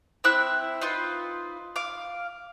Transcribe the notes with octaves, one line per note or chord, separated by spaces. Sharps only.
C4 E4 E6 F#6
D#4 F4 B4
F5 D6